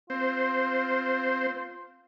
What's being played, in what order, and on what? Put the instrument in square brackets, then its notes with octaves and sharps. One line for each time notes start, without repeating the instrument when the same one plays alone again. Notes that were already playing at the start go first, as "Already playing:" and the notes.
[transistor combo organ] C4 C5 [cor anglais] F4